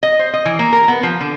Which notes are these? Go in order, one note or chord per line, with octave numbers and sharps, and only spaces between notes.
D#5
C5
D#5
E3
A#3
A#4
B3
F3
D3